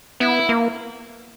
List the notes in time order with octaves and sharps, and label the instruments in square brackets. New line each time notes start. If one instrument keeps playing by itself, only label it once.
[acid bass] B3 [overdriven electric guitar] E4
[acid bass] A#3